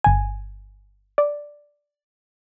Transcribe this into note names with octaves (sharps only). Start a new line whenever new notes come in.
G1 G#5
D5